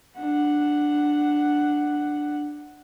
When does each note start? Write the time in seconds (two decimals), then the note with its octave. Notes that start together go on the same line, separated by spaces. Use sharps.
0.18 D4 F#5